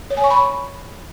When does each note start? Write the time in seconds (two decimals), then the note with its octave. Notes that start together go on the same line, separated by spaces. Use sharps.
0.10 C#5
0.17 G#5
0.24 C#6
0.30 B5